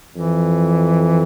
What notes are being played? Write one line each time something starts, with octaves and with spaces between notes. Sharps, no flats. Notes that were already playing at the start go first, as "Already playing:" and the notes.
F2 E3